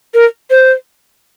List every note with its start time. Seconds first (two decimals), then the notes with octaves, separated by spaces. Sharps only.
0.14 A#4
0.50 C5